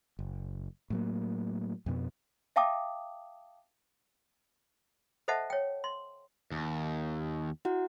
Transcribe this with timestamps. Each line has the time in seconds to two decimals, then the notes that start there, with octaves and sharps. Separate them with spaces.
0.19 F#1
0.90 A2 F#3 A#3
1.86 F2 B2 B3
2.56 E5 F5 G5 A5 D6 D#6
5.28 A4 C5 D#5 E5 F#5 A5
5.50 C#5 G5
5.84 C6
6.52 D#2
7.65 E4 F#4 F#5